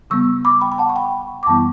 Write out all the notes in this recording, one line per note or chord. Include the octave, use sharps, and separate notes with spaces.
C#3 G3 B3 C#6 E6
B5 D6
G5 B5
B5
F#5 A5
C#6
G5 B5
D6
F#2 E3 G3 B3 E4 A5 C#6